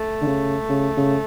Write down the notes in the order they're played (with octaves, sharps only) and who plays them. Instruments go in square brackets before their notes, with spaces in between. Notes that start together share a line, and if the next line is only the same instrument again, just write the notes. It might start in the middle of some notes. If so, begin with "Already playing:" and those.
Already playing: [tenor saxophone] A3
[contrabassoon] D3
C#3
C#3
C#3